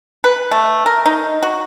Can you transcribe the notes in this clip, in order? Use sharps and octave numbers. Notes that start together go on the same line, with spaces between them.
B4
A3
A#4
D#4
F#4